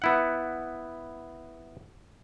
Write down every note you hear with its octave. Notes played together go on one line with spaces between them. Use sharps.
B3 E4 F#5